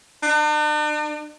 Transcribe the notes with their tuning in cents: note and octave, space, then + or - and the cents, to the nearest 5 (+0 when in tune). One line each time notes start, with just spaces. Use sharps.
D4 +45